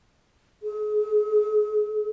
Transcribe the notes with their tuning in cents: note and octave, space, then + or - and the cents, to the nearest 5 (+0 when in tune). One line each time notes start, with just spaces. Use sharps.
G#4 +35